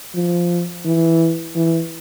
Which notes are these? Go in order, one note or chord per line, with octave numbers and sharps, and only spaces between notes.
F3
E3
E3